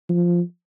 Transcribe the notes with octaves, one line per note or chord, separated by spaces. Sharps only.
F3